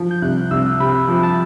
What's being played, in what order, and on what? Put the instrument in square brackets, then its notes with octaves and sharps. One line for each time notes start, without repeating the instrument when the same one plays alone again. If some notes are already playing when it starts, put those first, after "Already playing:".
Already playing: [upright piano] F3
[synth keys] G6
[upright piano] C2 [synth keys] F#6
[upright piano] C2 [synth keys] E6
[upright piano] C3 [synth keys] B5
[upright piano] F3
[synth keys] A5